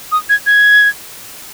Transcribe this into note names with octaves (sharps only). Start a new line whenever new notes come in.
D#6
G#6
G#6